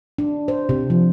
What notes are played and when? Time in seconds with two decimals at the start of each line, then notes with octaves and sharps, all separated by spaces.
0.18 D4
0.48 C5
0.69 C3
0.90 F3